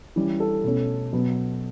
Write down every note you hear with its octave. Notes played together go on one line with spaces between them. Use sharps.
E3 G3 C#4
A4
B2 A3 C#4
B2 F#3 B3